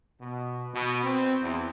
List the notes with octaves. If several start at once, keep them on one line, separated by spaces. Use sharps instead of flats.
B2
B2
C4
E2